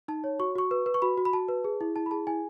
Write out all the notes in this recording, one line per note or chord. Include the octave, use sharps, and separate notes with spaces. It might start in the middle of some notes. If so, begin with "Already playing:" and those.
D#4 A5
C#5
F#4 C#6
F#4 C#6
B4
B4
C#6
F#4 B5
F#4
B5
F#4 A5
B4
G#4
E4
E4 A5
B5
G#4 A5
E4 G#5